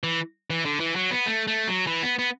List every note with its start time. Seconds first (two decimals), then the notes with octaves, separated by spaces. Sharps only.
0.04 E3
0.50 E3
0.65 D3
0.80 E3
0.96 F#3
1.11 B3
1.26 A3
1.47 A3
1.68 F#3
1.87 E3
2.03 B3
2.19 B3